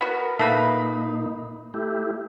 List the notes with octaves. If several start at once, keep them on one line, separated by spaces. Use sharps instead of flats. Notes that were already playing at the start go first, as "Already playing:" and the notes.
B3 F#4 A#4
A#2 A3 A#3 D#4 B4
A3 E4 G4